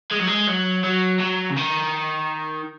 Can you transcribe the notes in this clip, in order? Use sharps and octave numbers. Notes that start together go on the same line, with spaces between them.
G#3
F#3
G#3
F#3
F#3
F#3
C#3
D#3